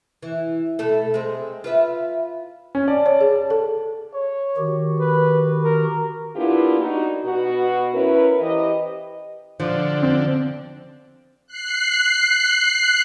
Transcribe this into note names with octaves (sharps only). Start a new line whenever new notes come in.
E3
B2 A3 A4
G#3 C4
F4 B4 E5
C#4
D5 A5
C#5
G#4
A5
A4
C#5
D#3 F#4 G4
B4
A#4
A#3 B3 D4 E4 F4 G4
D4 D#4 F#4
B2 F#4
C#4 E4 A#4 B4
E3 G4 B4 C5 D#5
D3 F3
C4
F#6 C7